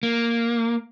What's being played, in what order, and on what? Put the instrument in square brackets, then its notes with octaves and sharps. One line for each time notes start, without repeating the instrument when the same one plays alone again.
[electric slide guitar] A#3